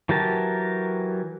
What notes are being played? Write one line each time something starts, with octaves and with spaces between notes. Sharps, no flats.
E3 F#3 G4 A#4 A5